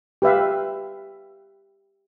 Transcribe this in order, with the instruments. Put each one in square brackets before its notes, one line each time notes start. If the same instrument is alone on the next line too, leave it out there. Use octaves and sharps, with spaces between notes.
[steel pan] G4 B4 E5 F5